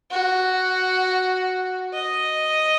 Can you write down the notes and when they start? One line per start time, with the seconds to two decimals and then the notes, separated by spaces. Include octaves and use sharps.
0.11 F#4
1.94 D#5